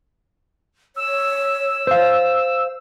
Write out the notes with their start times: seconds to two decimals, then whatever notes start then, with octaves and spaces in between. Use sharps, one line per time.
0.96 C#5 E6
1.87 C5 F5